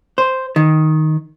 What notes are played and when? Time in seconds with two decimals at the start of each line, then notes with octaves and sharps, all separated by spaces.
0.18 C5
0.56 D#3